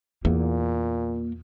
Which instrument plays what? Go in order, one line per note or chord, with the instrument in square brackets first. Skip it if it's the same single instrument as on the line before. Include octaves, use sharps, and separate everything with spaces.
[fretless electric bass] E2 [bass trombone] A#2 [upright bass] A#3